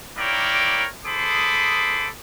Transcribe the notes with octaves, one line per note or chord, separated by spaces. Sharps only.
A#3 E4 A#4 C#5 D5 G5
G#4 A4 C5 B5 D6 D#6